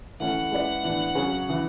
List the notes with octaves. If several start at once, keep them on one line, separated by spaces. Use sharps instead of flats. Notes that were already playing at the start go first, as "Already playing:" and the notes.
E3 A3 C#4 E4 F#5
G#3 C#4 E4 B4 D5
A2 E3 B3 D4
C#3 F#3 C#4 G#4 C#5
C#3 E3